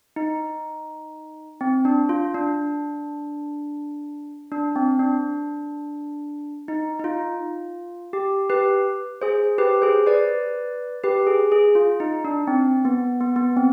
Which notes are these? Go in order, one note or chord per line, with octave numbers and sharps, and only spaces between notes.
D#4
C4
D4
F4
D4
D4
C4
D4
D#4
D#4
F4
G4
G4 B4
G#4 C5
G4 B4
G#4 C5
B4 D5
G4 B4
G#4
G#4
F4
D#4
D4
C4
B3
B3
B3
C4